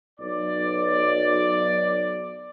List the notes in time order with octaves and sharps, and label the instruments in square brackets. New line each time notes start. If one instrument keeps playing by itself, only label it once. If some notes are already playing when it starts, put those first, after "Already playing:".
[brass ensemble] B1 D5